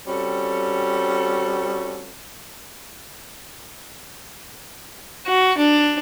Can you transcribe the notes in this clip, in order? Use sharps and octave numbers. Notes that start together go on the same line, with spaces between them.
G3 C4 C#4 F#4 A4
F#4
D4